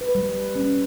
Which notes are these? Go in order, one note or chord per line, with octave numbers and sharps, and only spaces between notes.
B4
G3
C#4